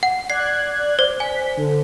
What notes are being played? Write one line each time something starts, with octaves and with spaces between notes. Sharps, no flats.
F#5
D5 F#6 G#6 C7
C5
G#5 B6
D3